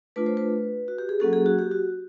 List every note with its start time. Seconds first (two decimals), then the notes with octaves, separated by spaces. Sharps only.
0.16 A3 D4 F4 B4
0.26 C5
0.37 B4
0.88 F#4
0.98 G4
1.09 G#4
1.20 F#3 A#3 C#4 F#4 A4
1.33 G#4
1.46 F#4
1.59 G4
1.71 F#4